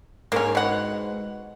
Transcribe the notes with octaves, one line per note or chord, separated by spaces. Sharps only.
G#2 A#3 C#4
B2 F#5